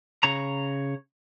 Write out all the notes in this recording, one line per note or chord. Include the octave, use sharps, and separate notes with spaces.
C#3 C#5 A#5